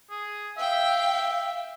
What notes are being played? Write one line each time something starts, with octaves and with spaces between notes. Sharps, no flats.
G#4
E5 F5 G5